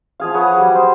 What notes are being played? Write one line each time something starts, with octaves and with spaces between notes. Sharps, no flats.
F3 G#4 F5
G#4 B4 C#5 F#5
F#3 G3
C5